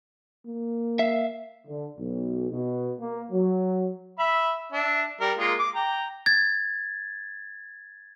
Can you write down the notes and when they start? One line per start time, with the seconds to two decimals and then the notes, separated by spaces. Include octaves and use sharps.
0.45 A#3
0.99 E5 F5
1.67 D3
1.97 B1
2.51 B2
3.00 A#3
3.32 F#3
4.19 E5 B5
4.72 D4 E5
5.21 G3 A#4
5.38 G#3 A#3 F4
5.59 D6
5.75 G5 A#5
6.26 G#6 A6